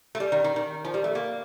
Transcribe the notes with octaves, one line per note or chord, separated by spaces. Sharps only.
A3
G3
D#3
D#3
D#3
F3
G3
A3
A#3